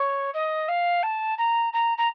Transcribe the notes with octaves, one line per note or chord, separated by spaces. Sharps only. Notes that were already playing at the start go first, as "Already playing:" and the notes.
Already playing: C#5
D#5
F5
A5
A#5
A#5
A#5